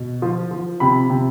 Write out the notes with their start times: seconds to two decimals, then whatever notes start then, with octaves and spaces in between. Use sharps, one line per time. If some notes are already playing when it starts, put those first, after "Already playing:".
Already playing: B2
0.22 F3
0.51 F3
0.80 C3 B5
1.10 C3